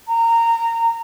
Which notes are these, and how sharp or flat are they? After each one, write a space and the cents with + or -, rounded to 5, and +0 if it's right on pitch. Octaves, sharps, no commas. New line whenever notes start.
A#5 -20